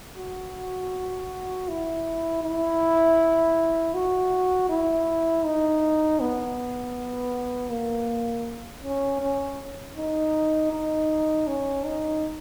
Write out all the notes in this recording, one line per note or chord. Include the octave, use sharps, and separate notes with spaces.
F#4
E4
E4
F#4
E4
D#4
B3
A#3
C#4
C#4
D#4
D#4
C#4
D#4